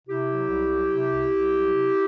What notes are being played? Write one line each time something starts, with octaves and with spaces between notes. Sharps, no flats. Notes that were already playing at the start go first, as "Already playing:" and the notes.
C3 E4 G4
F#3
C2
F#3
C3
C2
C2
F#3
C3